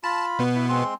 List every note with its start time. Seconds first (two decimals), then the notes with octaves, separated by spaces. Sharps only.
0.04 F4 A5 B5
0.39 B2 B3
0.55 E4
0.69 G#3 C4 C6